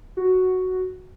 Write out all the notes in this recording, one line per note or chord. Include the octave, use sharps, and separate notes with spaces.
F#4